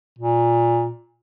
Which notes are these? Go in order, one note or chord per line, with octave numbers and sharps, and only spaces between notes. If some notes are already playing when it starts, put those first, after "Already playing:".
A#2